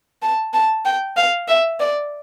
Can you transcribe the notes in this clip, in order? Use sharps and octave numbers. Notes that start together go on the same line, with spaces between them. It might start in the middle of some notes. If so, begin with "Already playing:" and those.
A5
A5
G5
F5
E5
D5